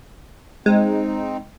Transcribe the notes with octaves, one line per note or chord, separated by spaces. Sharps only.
G#3 C4 D#4